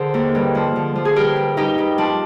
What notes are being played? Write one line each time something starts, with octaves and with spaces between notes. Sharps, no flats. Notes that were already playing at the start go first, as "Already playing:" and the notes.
Already playing: D3 G#4 A#4 C5
D#2
G2
F3
D3
F3
G#4
G2 G4 A#4
G2
G2 D#4 G4
G2
F3 D4